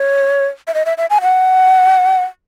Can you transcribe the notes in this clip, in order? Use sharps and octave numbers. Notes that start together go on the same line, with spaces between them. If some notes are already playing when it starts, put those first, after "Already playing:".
Already playing: C#5
E5
D#5
E5
E5
G#5
F#5